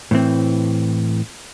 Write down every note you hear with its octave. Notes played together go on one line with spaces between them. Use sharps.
A2 E3 C4